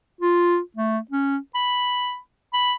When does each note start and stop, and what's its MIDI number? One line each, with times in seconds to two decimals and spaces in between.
0.21 0.59 65
0.77 0.98 57
1.11 1.37 61
1.55 2.18 83
2.53 2.75 83